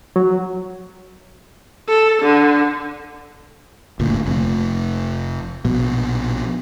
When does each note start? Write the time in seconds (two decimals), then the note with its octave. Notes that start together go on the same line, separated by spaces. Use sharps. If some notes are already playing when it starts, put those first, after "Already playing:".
0.16 F#3
1.89 A4
2.22 D3
3.99 F#1 D2 A#2
4.26 F1
5.65 A#1 B2